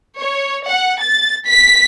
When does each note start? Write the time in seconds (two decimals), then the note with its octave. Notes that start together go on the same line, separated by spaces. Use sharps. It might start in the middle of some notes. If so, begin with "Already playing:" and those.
0.20 C#5
0.68 F#5
1.01 A6
1.47 B6